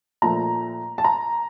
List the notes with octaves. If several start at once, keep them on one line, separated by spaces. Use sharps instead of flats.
A#2 F3 A3 A#5
A5
A#5